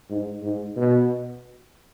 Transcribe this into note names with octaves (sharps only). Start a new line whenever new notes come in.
G#2
G#2
B2